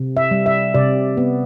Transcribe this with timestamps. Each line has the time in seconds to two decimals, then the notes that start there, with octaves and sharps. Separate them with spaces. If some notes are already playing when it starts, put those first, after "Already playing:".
Already playing: C3
0.17 E5
0.31 G3
0.46 E5
0.74 C3 D5
1.17 B3